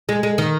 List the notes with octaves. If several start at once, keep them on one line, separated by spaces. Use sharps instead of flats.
G#3
G#3
D#3